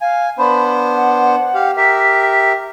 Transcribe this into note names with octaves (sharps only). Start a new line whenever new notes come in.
F5 G#5
B3 D4 C5 B5
F#5
G4 F5
G4 A#4 E5 B6